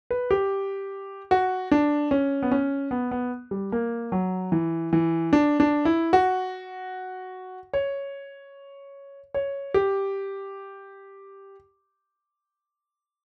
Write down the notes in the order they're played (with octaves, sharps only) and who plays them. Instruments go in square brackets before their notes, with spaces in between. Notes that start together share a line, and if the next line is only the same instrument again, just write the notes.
[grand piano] B4
G4
F#4
D4
C#4
B3
C#4
B3
B3
G3
A#3
F#3
E3
E3
D4
D4
E4
F#4
C#5
C#5
G4